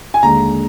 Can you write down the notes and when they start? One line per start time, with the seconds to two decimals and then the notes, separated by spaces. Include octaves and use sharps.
0.14 G#5
0.22 D#2 D3 G#3 A#5